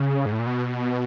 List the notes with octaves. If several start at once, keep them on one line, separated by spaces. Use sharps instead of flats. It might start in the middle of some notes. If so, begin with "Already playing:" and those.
Already playing: C#3
G#2
A2
A#2
B2